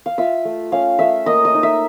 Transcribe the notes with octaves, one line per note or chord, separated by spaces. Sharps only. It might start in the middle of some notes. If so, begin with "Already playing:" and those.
F5
F4 E5
A3
C#4 F5
A3 E5
A#3 D#5
D#5
D#4
E5